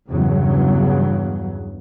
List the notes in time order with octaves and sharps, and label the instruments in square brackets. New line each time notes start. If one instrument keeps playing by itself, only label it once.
[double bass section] E2 G2 C#3 F#3